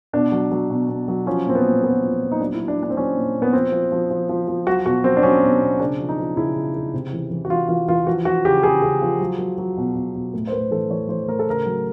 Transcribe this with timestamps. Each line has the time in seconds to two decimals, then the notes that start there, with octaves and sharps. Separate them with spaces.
0.13 B2 D4
0.32 F#3
0.51 F#3
0.70 B2
0.89 B2
1.08 F#3
1.26 F3 C#4
1.45 A#2 C4
1.55 B3
1.64 A#2
1.83 F3 B3
2.03 F3
2.22 A#2
2.32 D#4
2.40 F#3 D4
2.54 E4
2.59 F#3
2.68 D4
2.79 A#2 D4
2.90 C4
2.96 F#3 C#4
3.16 A#2
3.35 A#2
3.42 B3
3.53 F3 C4
3.72 F3
3.92 F3
4.10 F3
4.29 F3
4.48 F3
4.67 F#3 F#4
4.86 B2 F#4
5.04 F#3 C4
5.17 D4
5.23 F#3 C#4
5.43 B2
5.61 B2
5.80 C#3 D4
5.99 F3
6.09 D#4
6.18 F3
6.37 C#3 E4
6.56 C#3
6.74 C#3
6.94 C3
7.13 E3
7.31 E3
7.45 F#4
7.50 E3 F4
7.68 E3 F4
7.88 E3 F4
8.07 F3 F#4
8.25 F3 F#4
8.45 C#3 G4
8.63 C#3 G#4
8.82 C#3
9.01 F3
9.20 F#3
9.39 F#3
9.58 F#3
9.77 B2
9.95 B2
10.15 B2
10.34 A2
10.47 C5
10.52 A2 B4
10.71 E3 A4
10.90 E3 C#5
11.08 E3 C5
11.28 A2 A#4
11.39 A4
11.47 C#3 A#4
11.66 F#3